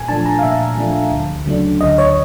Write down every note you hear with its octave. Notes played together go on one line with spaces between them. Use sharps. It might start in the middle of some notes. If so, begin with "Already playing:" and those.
Already playing: A#2 G#5
F3 A3 D4 A5
A#5
F5
A#2 E5
F3 A3 D4
D2
C#3 F#3 A3 D4
D2 D#5
C#5